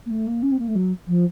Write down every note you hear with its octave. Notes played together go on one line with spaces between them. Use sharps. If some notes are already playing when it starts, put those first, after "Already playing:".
A#3
A3
A#3
C#4
C4
A#3
A3
F#3
F3